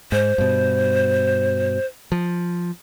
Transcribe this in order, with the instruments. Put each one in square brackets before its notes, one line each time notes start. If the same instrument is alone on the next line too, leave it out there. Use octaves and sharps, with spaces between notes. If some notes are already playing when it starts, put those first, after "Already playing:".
[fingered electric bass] G#2 [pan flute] C5
[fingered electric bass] G2 B2
F3